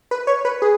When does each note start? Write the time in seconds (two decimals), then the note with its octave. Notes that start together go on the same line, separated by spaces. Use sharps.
0.11 B4
0.27 C#5
0.45 B4
0.62 G#4